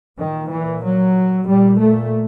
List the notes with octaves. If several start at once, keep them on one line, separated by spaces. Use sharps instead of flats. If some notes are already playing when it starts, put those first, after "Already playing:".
A#2 D#3
E3
F#3
A#2 G3
A3